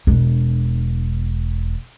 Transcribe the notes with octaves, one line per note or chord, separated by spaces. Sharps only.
E1 D4